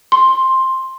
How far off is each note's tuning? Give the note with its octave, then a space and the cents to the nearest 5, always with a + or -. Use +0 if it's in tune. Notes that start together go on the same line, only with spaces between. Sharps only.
C6 +10